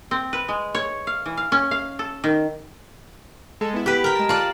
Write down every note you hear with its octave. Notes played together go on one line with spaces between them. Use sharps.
C4
B4
G#3
C#5
F5
E3
F5
C#4
F5
A4
D#3
G#3 A4
B3 E4
G4 B4
A#4 G5
G#3 A5
F4 D5 A5 C6 F#6